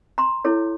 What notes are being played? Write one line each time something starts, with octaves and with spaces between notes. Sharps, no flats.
A#5 C6
E4 A4 C#5